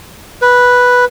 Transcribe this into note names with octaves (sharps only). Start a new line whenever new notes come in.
B4